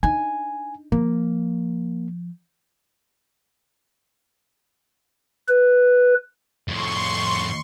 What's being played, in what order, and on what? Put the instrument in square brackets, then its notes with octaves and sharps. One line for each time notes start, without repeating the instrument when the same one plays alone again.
[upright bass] D4 D#4 [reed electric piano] G#5
[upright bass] F3 [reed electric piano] A#3
[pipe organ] B4
[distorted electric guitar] F2 A2 [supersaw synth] C6 C#6